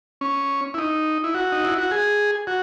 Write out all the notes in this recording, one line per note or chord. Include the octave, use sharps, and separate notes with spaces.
C#4
E4
D#4
E4
F#4
D#4
E4
F#4
G#4
F#4